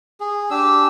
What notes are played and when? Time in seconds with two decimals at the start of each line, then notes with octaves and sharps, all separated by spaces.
0.20 G#4
0.51 D4 G4 E6